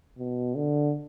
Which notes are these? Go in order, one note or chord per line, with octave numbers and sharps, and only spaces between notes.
B2
D3